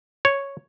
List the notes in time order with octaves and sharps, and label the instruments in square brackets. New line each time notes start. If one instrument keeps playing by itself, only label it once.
[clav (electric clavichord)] C#5